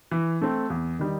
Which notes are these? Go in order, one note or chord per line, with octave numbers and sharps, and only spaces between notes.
E3
A3 C4
E2
D#3 G3 D#4